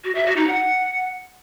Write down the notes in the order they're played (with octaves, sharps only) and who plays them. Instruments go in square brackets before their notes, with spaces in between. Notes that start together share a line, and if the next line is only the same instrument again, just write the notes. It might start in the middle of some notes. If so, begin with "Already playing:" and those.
[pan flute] F#4
E5
F#4
D#4
F#5